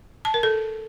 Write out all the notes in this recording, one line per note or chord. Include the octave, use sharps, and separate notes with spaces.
A5
A#4
A4